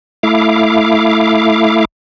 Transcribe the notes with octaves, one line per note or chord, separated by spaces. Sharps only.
A3 E4 F5 D6